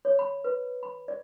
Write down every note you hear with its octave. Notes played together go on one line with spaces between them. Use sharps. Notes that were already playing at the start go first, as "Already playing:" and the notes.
C#5
B5
B4
B5
D5